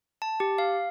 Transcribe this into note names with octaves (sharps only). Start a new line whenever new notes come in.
A5
G4
F5